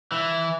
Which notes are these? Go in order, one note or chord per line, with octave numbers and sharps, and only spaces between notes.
E3